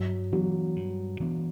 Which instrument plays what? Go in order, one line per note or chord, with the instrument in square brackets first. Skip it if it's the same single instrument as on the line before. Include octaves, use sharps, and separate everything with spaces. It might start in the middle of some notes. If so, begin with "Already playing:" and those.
Already playing: [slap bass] G2 [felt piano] F#3
[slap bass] E3 B3 D4 [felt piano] F#3
[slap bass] G2
E3 B3 D4